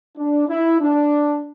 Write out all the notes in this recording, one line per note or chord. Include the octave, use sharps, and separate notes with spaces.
D4
E4
D4